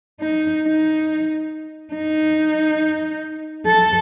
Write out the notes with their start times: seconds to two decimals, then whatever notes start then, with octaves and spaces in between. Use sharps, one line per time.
0.21 D#4
0.64 D#4
1.94 D#4
3.67 A4